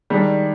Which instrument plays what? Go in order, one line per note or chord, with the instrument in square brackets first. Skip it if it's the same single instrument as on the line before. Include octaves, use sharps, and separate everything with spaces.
[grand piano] D#3 G#3 D4 G#4 D5 [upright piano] G3